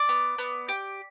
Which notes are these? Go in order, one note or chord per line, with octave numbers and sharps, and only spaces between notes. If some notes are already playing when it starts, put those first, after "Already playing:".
Already playing: D5
B3
B3
G4